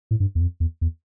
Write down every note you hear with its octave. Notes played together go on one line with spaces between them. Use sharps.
A2
G2
E2
F2
E2
E2